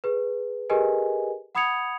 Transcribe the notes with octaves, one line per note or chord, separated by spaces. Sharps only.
G#4 B4
G4 G#4 A#4 B4 D#5 G#5
F#5 B5 D#6 G#6 C#7 F7